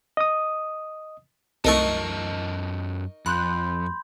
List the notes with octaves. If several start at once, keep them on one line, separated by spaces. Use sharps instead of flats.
D#5 D#6
C2 F#2 A3 D#4 A#4 D#5 A5 C#6
F2 B5 C6 F#6 G6